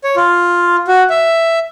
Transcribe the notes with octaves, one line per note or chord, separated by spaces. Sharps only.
C#5
F4
F#4
E5